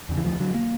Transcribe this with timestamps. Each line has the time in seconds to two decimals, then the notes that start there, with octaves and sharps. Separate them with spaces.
0.09 E2 C#3
0.17 E3
0.24 D2 F3
0.40 D3 F#3
0.54 A#3